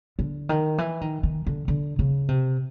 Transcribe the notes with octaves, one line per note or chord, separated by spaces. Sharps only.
D3
D#3
E3
D#3
D#3
D3
D3
C#3
C3